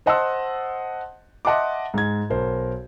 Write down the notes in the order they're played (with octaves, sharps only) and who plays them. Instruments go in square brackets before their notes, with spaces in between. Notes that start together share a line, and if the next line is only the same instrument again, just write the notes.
[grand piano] C5 D#5 F#5 A5 C6 E6
D#5 E5 F#5 A5 C6 D6
G#2 G#6
B1 A#4 C5